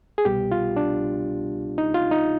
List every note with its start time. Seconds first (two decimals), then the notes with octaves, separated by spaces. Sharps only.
0.18 G#4
0.25 C2 B2 G3 B3 G4
0.52 F4
0.76 D4
1.78 D#4
1.94 F4
2.11 D#4